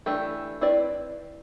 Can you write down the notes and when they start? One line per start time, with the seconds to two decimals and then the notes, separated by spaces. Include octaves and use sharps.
0.06 E3 A3 D4 G4
0.61 C4 E4 B4 D5